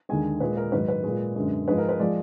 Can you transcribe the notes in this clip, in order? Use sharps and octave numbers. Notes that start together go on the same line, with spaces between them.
D#2 D3 G#3 G#5
A#2 G#3 B4
A#4
G#2 D#3 F#3 B4
B4
A#2 G#3
F#2 D3 G#3
G#2 F3 G#3 B4
A#4
B4
F3 G#3 D5